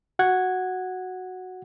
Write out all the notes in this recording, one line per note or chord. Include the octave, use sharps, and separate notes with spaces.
F#4 F#5 G#6